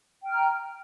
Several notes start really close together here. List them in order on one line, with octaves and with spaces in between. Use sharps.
G5 F6 A#5